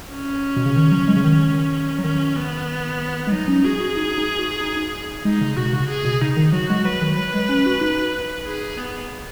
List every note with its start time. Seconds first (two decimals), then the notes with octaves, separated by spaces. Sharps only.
0.11 C#4
0.57 B2
0.66 C#3
0.76 D#3
0.92 F#3
1.08 G#3
1.16 C#3
1.24 D#3
1.99 F#3
2.04 D#3 C#4
2.36 B3
3.27 G#3
3.32 F#3 D#4
3.48 C#4
3.64 F#4 G#4
3.80 F#4
3.97 D#4
4.18 D#4
4.39 F#4
4.61 D#4
4.76 D#4
5.25 G#3 D#4
5.41 C#3
5.57 B2 F#4
5.73 C#3
5.89 G#4
6.05 B2
6.21 C#3 D#4
6.37 D#3
6.53 F#3 F#4
6.70 G#3
6.85 F#3 B4
7.01 D#3
7.17 F#3 B4
7.34 G#3
7.49 C#4
7.66 F#4
7.81 D#4
8.46 G#4
8.78 B3